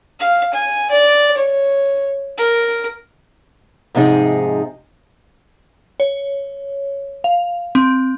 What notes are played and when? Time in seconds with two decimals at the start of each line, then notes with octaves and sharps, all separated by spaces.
0.20 F5
0.53 G#5
0.91 D5
1.37 C#5
2.38 A#4
3.95 G#2 C3 F3 D#4 G#4
6.00 C#5
7.24 F5
7.75 C4